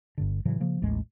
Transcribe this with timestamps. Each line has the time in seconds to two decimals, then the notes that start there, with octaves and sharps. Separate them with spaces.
0.18 G1 G2 D3
0.45 A2 C#3 E3 F#3
0.60 C#3 F3 A#3
0.82 A1 D#2 A2 G#3